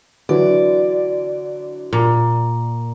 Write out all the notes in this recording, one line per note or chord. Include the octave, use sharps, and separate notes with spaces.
D3 E3 F#3 D5
A#2